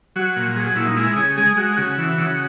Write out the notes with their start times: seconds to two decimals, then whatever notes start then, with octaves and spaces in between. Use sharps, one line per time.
0.16 F#3 F#4
0.36 A#2
0.56 F#3 G#4
0.66 G#4
0.76 A#2 E4
0.86 D#4
0.96 G#3 E4
1.16 C#3 G#4
1.37 G#3 G#4
1.57 G#3 F#4
1.77 C#3 F#4
1.98 E3
2.18 C#3